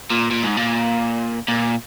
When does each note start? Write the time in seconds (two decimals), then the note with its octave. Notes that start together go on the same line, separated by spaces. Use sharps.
0.11 A#2
0.31 A#2
0.44 G#2
0.57 A#2
1.48 A#2